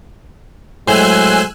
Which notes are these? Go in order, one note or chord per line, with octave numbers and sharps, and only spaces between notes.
A2 F#3 G#3 C5 G#5 E6 F#6